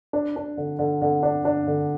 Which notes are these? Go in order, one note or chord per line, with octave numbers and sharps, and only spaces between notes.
D4
D4
D3
D3
D3
D4
D4
D3